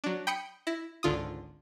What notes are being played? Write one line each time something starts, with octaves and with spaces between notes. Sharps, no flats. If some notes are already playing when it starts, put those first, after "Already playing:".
F#3 D4
G5 B5 D#6 C#7
E4 A#6
G#1 C#2 D3 F4 D#6